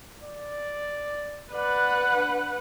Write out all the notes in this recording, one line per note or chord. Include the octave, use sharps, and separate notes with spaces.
D5
B4 D5 F#5
D4